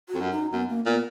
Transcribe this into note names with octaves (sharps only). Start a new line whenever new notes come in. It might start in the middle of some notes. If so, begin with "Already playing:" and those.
F#4
F2
F#2
D#4
F#2 B3
A#3
A#2 B3